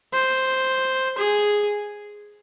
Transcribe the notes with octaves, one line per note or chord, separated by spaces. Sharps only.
C5
G#4